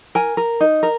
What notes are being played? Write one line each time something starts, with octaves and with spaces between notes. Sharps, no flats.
A#4 G#5
A#4
D#4
A#4